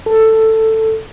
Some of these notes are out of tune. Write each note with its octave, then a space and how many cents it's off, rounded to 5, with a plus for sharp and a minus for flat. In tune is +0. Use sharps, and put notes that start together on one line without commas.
A4 +10